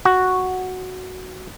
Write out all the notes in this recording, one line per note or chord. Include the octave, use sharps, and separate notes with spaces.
F#4